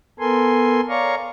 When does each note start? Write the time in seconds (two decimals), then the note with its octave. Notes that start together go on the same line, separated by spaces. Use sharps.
0.19 B3 A4 A#4 G#5 C6
0.89 C#5 D5 F5 A#5 C#6